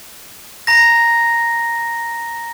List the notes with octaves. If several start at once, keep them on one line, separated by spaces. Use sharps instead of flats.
A#5 A#6